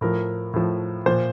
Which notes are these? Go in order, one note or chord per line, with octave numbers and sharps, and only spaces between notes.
A2 F3 A#4
A2 F3
A#2 F3 C5